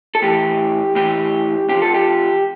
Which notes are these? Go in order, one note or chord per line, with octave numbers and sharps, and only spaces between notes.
A4
A2 E3 G4
A2 E3 G4
C3 F3 G4
A4
G4